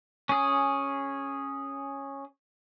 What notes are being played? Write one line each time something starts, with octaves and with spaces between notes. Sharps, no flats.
C#4 G#4